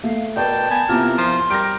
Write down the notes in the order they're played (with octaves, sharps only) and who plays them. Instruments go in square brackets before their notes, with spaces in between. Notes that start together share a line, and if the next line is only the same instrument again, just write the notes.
[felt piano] A3 [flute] F5
[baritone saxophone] B2 [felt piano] A#4 B4 D5 [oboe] G5 [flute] A5
[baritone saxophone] B3 [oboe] G#5
[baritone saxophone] C3 [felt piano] B3 E4 F4 [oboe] A#4
[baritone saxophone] F3 [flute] C6
[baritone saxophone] G3 [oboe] A#4 [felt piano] A#6 D7